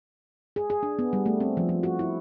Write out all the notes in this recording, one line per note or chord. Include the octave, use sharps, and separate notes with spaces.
G#4
G#4
D4
B3
G3
A3
C4
F3
F3
F#4
E4